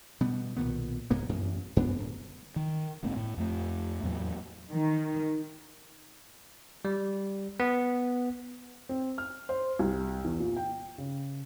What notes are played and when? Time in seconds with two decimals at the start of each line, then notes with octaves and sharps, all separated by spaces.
0.21 B2 G3 B3
0.57 B1 A#2 D#3 B3
1.10 C2 G2 A#3 B3
1.29 A1 F#2
1.76 F#2 B3 D4
1.99 D1
2.56 D#3
3.03 F#1 G#2 A#3 C4
3.17 A2
3.38 F2 A3
4.03 E2 A2 F#3 A#3
4.71 D#3
6.85 G3
7.60 B3
8.89 C4
9.18 F6
9.49 C5
9.79 C2
10.24 E2
10.40 A#2
10.57 G5
10.98 C#3